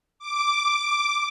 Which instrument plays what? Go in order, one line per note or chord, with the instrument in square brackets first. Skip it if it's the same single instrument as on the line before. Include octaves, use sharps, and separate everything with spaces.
[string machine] D6